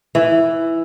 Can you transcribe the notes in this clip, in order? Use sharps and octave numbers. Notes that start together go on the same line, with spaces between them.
E3